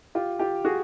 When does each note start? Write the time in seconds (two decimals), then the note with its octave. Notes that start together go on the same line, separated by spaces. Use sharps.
0.15 F4 G4
0.39 F4 G4
0.65 F#4 G#4